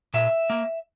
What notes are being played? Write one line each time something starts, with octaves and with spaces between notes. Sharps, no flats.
A#2 E5
A#3